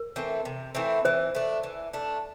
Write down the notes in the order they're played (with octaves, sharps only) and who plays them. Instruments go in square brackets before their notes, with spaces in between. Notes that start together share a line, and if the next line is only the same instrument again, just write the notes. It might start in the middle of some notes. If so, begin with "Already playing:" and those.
Already playing: [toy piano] A#4
[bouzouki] E3 A3 C4
C3
E3 A3 C4
[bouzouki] E3 [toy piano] C5
[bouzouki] A3 D4
E3
A3 D4